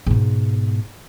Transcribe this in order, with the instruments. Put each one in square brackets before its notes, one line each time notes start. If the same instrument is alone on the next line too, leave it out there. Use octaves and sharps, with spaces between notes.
[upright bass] G#2 B2